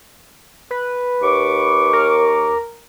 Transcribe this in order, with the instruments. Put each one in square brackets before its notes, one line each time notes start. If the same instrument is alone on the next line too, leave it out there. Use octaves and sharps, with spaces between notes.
[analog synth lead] B4
[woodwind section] D#2 C#6 D6
[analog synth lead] A#4